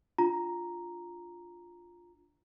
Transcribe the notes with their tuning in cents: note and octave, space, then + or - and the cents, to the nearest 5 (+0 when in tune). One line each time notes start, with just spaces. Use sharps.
D4 +0 F4 +0 A#5 +0